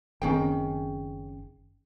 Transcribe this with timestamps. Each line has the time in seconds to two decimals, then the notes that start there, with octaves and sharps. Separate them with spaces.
0.22 F#1 D#3 C4 C#4 G#4 G5